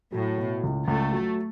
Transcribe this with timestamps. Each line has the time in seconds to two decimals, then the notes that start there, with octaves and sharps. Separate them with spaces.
0.12 A2 F#3
0.38 B2
0.63 C#2
0.88 C#2 A3
1.12 F#3